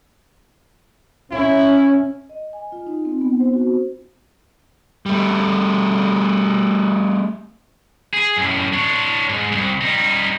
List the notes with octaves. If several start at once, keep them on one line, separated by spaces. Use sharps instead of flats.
C#4 E4
D#5
G#5
F4
D#4
C4
B3
C5
F#4
G3 A3
G#4
F#2 A2
D4 C#5
G#2
C2
G3 D#4